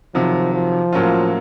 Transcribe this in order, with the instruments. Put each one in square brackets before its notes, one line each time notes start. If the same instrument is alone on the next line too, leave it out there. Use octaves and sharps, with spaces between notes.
[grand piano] C3 D#3 F#3 [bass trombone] F3
[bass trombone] F3
[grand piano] A2 F#3 A#3 C#4 F4